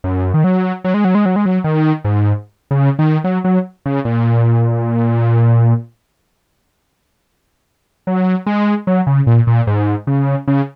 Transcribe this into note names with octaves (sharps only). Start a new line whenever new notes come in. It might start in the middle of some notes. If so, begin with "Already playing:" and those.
F#2
D#3
F#3
F#3
G#3
F#3
G#3
F#3
G#3
F#3
D#3
G#2
C#3
D#3
F#3
F#3
C#3
A#2
F#3
G#3
F#3
C#3
A#2
A#2
G#2
C#3
C#3